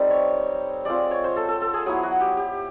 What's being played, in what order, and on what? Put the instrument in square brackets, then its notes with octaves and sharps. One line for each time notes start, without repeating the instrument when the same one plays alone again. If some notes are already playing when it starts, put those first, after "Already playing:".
Already playing: [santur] G3 A3 C4 D#4
C#5
G#3 C4 F4 D5
C#5
C5
A4
A4
A4
G#4
F#3 B3 E4 G#4
F#4
G4
G4